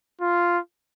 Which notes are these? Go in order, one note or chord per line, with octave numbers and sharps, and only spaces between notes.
F4